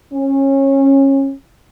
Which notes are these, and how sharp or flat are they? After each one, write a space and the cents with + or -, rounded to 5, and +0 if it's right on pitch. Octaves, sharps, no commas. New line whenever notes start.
C#4 -25